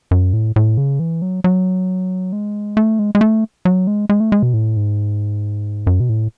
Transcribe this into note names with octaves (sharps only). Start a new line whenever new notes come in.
F#2
A2
A2
C#3
E3
F#3
F#3
G#3
A3
G#3
G#3
A3
F#3
G#3
G#3
A3
G#3
B2
A2
G#2
F#2
B2
A2